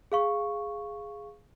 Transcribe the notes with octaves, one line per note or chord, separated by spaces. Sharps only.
G#4 F5 C#6